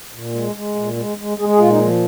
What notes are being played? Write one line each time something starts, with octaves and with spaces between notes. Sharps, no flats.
A#2
G#3
G#3
A#2
G#3
G#3
G#3 G#4
G#4
A#2 F4
D#4
F3